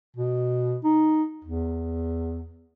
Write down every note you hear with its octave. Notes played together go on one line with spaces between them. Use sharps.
B2
D#4
E2